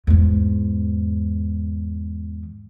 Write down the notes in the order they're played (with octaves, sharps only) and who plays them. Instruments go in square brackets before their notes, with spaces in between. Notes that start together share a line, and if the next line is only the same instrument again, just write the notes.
[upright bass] E2 G#2